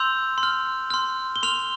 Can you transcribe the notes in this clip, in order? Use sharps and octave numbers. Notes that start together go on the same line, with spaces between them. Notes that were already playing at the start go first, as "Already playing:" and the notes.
Already playing: C6 E6 G6 F7
C6
F6
C6 F6
G7
C6 F6 F7